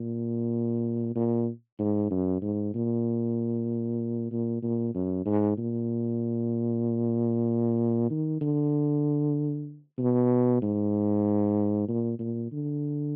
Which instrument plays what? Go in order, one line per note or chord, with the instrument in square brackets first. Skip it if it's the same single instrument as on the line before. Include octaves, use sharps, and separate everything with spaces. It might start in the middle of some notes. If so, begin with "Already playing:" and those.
Already playing: [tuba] A#2
A#2
G#2
F#2
G#2
A#2
A#2
A#2
F#2
G#2
A#2
D#3
D3
B2
G#2
A#2
A#2
D3